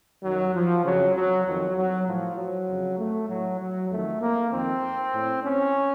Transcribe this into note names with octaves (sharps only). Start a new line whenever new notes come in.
F#2 D#3 F#3
F3
F2 C#3 F#3
F#3
F2 D#3 F#3
F#3
A2 F3
F#3
F2 C#3
A3
A2 F#3
F#3
F2 D#3 A3
A#3
F2 D#3 C4
A2
C#4